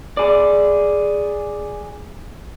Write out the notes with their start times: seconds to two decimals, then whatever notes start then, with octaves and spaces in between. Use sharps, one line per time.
0.17 G#4 D5